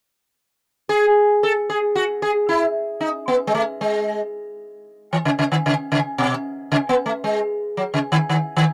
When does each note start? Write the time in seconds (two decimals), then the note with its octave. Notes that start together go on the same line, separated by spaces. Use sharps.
0.89 G#4
1.43 A4
1.70 G#4
1.95 F#4
2.22 G#4
2.49 E4
3.00 D#4
3.28 B3
3.47 G#3
3.55 A3
3.81 G#3
5.13 E3
5.25 C#3
5.39 C#3
5.52 D#3
5.66 C#3
5.92 C#3
6.18 B2
6.72 C#3
6.89 B3
7.06 A3
7.24 G#3
7.77 F#3
7.94 C#3
8.12 D#3
8.29 D#3
8.57 D#3